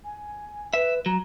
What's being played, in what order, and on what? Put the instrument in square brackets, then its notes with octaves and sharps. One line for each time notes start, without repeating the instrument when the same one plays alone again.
[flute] G#5
[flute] B4 [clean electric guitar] E5
[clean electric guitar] F#3 [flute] A#5